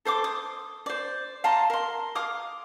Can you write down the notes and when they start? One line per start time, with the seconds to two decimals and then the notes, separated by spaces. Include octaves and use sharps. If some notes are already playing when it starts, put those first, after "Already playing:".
0.05 A4 C5 C6 D6
0.24 D#6
0.86 C5 D5
1.44 F5 A5 A#5 C6
1.70 A#4 C6
2.15 F5 D6 D#6